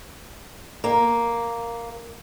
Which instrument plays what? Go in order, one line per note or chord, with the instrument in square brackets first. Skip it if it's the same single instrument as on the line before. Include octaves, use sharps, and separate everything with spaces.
[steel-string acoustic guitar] A#3